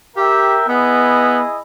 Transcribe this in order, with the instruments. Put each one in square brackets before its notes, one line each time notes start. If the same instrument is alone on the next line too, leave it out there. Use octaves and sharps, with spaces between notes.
[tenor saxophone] G4 [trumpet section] A#4 E5 G5
[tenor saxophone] B3 [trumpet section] E4 G#4 D#5